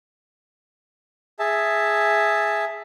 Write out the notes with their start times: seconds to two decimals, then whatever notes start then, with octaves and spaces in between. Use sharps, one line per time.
1.39 G#4 E5 A5